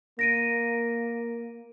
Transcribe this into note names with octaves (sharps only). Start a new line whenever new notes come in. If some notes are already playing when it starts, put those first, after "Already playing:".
A#3 A#6 D7 D#7